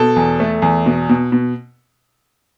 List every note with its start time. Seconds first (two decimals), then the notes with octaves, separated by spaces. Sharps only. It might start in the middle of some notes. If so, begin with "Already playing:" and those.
Already playing: B2 A4
0.16 E2
0.40 A3
0.62 E2
0.86 B2
1.09 B2
1.32 B2